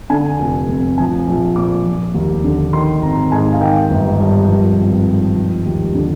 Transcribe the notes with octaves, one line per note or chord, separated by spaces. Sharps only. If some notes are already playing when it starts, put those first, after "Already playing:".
D3 G#5
F1
F2
F3 G#5
A#1
A#2 D6
F3
D#2
D3
D#3 C6
G#1 A#5
G#2 G#5
F5
D#3 G5
G1
G2
F3
G#1
G#2
F3
D#2 G4
D3